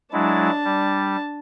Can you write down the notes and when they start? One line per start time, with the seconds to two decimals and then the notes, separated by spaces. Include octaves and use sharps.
0.13 F#3 G#3 D4 E4 A5
0.64 G3